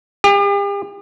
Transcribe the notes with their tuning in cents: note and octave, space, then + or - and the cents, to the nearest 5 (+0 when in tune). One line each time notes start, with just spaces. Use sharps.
G4 +45